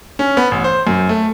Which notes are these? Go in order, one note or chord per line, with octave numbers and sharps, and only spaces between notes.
C#4
B3
A1
C5
F#2
A3